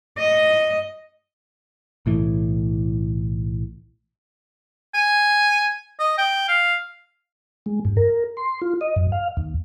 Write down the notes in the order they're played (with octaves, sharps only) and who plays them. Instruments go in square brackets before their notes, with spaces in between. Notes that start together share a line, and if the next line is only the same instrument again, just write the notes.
[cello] D#5
[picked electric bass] B1 A2 E3
[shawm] G#5
D#5
G5
F5
[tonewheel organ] G#3
G2
A#4
C6
F4
D#5
F#2
F5
D#2